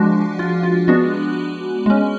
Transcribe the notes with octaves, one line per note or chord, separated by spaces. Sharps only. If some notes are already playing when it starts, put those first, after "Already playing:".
Already playing: F3 G#3 D4 F#4
F4
F4
G#3 B3 D4 F#4
G#3 C#4